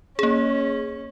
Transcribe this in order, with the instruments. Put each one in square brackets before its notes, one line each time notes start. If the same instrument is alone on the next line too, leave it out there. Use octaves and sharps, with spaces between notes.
[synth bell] A#3 G#4 [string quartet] C#4